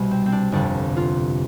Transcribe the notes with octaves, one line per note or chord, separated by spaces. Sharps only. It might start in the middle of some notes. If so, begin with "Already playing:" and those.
Already playing: C2 B2 G3
C4
C4
D4
G1 F2 C3 D4
F4